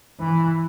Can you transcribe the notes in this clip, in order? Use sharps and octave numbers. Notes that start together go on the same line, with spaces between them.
E3